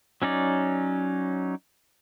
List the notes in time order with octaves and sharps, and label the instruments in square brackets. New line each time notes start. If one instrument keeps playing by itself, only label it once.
[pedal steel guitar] F#3 C#4 D#4 D5